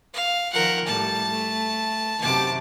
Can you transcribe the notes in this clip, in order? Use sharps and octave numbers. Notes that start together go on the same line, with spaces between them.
F5
D#3 F3 A#4 F#5
A2 G3 A3 A5
A3
F#2 C3 D#3 A5 D6